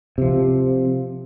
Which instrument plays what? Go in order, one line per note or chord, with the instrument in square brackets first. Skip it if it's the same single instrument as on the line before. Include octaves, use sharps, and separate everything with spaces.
[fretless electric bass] C3 F3